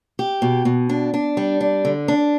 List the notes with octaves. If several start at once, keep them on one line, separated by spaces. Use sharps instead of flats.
G4
B2
B2
D4
D4
G3
D4
D3
D4